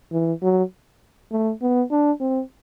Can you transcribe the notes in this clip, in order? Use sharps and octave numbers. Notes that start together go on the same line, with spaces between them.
E3
F#3
A3
B3
D4
C4